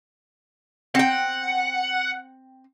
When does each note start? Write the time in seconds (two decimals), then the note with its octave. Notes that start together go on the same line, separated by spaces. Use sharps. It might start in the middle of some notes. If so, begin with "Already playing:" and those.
0.95 C4 F#5 G5